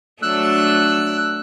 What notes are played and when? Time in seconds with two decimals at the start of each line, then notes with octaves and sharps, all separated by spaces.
0.22 F#3 A3 D4 E6 F#6